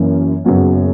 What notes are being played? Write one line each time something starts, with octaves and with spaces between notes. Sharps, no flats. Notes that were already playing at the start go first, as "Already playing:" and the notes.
Already playing: F#2 E3 A#3 C#4
F#1 F#2 C#3 F#3 B3